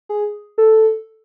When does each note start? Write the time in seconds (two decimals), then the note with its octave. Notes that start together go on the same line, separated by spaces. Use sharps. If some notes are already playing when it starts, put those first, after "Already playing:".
0.09 G#4
0.58 A4